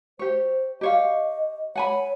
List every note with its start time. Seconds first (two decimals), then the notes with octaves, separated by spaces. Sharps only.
0.19 G4 C5 C#5
0.81 G4 C#5 D#5 F5
1.76 C#5 F#5 G#5 B5